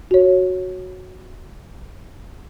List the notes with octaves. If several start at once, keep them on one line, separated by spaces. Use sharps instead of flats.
F#4 C#5